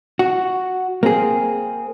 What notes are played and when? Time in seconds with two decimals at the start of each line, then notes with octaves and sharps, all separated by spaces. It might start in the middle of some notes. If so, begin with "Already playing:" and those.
0.19 F#4
1.03 A#3 C4 G#4